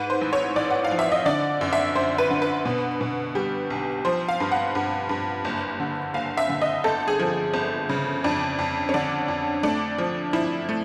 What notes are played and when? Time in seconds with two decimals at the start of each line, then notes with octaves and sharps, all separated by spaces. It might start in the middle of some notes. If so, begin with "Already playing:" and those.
Already playing: G#2 B4
0.10 C5
0.21 A1
0.33 C#5
0.56 A1 D5
0.70 F#5
0.84 F5
0.91 F3
0.99 E5
1.12 D#5
1.26 D3 D5
1.61 F#2
1.73 E5
1.96 F#2 C5
2.18 B4
2.30 D3
2.42 B4
2.65 B2
3.01 B2
3.35 G3
3.70 B1
4.05 F3 C5
4.29 F5
4.40 G2
4.52 F#5
4.75 G2
5.09 G2
5.45 F#1
5.80 D3
6.14 F#1 F5
6.37 E5
6.49 D3
6.62 D#5
6.84 G1 A4
7.08 G#4
7.19 F3
7.54 G1
7.89 C#3
8.24 F2 D4
8.59 F2
8.89 C#4
8.94 D3 D4
9.28 F2
9.63 A3 D4
9.98 F3
10.33 F3 E4
10.69 A3